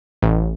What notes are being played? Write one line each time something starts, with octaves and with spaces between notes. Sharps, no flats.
A1